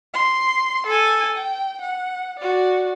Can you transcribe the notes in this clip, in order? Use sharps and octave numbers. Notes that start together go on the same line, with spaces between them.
C6
A4 G#5
G5
F#5
F#4 D5